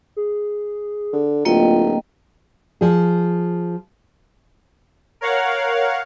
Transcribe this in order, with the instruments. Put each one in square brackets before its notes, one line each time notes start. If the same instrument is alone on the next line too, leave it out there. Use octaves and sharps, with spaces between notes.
[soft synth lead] G#4
[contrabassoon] D3
[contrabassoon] D1 [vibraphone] A#3 D#5 G5 [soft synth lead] F4
[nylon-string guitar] F3 G#4
[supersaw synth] A#4 C#5 F5 F#5